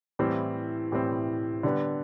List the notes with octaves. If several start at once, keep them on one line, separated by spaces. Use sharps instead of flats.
A2 E3 G3 C4
A2 E3 G3 C4
D3 G3 B3